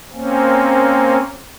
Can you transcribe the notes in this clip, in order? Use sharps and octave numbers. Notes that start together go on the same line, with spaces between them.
A#3 C4 C#4